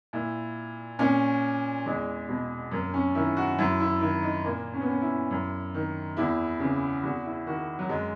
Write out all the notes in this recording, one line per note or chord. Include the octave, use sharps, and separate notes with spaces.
A#2 E4
A#2 C#4
E2 G#3
B2 G#3
F#2 A#3
C#4
D#3 E4
F#4
F#2 E4
E4
D#3 E4
D#4
A#2 A#3
C#4
B3
C#4
E4
F#2
D#3
E2 E4
C#3 E3
E2 F#4
E4
D#3 F#4
F#3
F#2 G#3